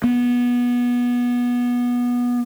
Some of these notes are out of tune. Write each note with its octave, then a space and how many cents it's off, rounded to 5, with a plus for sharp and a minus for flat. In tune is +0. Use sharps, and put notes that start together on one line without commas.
B3 -20